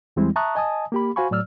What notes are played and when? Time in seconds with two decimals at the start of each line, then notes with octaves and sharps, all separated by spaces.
0.16 E2 E3 G3 G#3 C4 E4
0.36 E5 A5 A#5 C#6 D#6 F#6
0.55 D#5 G#5 A5 D#6
0.92 A#3 G4 B5
1.16 F#4 C5 F5 G#5 B5 C#6
1.31 A2 F#3 D5 E6 F6